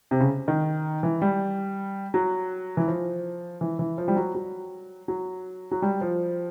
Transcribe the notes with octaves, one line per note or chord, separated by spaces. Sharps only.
C3
C#3
D#3
E3
G3
F#3
E3
F3
E3
E3
F3
G3
F#3
F#3
F#3
F#3
G3
F3